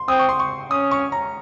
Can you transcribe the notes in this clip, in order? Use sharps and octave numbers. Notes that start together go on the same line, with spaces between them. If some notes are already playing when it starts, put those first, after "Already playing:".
Already playing: C6
C4 D#6
C#6
C6
C#6
C#4 D#6
C#6
A#5